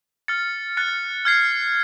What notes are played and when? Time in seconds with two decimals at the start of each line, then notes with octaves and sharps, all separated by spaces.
0.28 F6 A6 C#7
0.77 F#6 A6 C#7
1.25 F6 G#6 C7